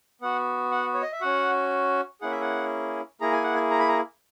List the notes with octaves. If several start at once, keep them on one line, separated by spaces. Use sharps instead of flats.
B3 F#4 F#5
F#5
C#5
D#5
E5
C#4 F#4 F#5
A#3 C#4 E4 G#4 F#5
E5
F#5
A#3 E4 G#4 A#5
G#5
F#5
G#5
A#5
B5
A#5